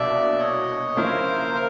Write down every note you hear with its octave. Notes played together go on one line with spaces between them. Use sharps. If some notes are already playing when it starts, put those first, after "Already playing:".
Already playing: C2 B2 F#3 A#3 D4 D5 E5
C#5 D#5
C#3 F3 A#3 C#4 E4 A#4 C5
A#4